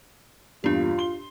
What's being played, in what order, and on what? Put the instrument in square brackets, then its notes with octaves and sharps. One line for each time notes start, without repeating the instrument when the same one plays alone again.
[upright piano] E2 G2 A#2 [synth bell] D4 G4 [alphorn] F4
[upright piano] C6 G7